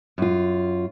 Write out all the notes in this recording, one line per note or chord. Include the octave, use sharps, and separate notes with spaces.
F#2 F4